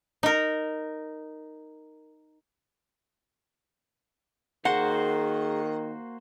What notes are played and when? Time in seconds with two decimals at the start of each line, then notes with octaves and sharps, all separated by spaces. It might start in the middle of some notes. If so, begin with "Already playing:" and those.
0.23 D#4 A#4
4.65 D#3 A#3 F#4 G#4 C5 F#5